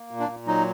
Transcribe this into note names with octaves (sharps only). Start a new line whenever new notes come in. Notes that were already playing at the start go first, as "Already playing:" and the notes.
Already playing: A#3
A#2
D4
A#2
F#3 D#4